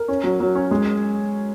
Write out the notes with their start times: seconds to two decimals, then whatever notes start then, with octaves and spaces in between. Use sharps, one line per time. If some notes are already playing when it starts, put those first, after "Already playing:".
Already playing: A#4
0.08 C#4
0.24 F#3
0.40 F#3
0.55 C#4
0.71 G#3